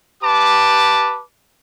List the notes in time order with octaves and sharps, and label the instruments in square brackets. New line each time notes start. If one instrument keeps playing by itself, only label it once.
[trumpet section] G4 B4 A5 D6